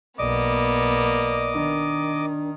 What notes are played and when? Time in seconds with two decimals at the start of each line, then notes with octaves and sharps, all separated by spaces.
0.19 B1 A#3 B3 D5 D#5 D6
1.55 D#3 D4